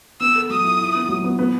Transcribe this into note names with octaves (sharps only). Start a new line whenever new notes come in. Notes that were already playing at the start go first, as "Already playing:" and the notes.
B3 E6
A4
F#3 D#6
E4
E4
B3
F#3
B3
B3